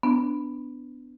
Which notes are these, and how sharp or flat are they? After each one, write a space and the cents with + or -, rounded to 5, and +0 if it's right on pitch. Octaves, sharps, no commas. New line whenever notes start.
B3 +20 D4 +0